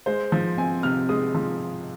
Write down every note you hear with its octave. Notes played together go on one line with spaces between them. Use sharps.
G#3 C5
F3
C4 G#5
C3 F6
G#3 D#6
F3